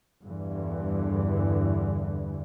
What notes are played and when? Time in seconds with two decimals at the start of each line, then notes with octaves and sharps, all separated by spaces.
0.23 E2 G2 D3 E3